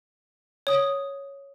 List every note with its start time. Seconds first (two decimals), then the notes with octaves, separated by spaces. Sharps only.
0.67 C#5 D#6